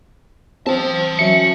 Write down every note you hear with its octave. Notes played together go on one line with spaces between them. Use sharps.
C4 C5 A5
F#3 C#4 E5 C#7